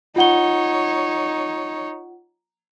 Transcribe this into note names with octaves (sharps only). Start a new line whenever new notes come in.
D#4 F4 C#5 F#5 G7